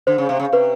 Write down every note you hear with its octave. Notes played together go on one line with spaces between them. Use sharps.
D3 C5
C#3
C3
C#3
C3 B4